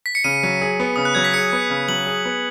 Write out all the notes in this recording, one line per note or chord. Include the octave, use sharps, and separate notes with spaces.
B6
C#7
C#3 D#7
F#3
G#4
B3
C#3 D#6
F#6
F#3 G#6
B6
G#4 C#7
B3
C#3
F#3 F#7
G#4
B3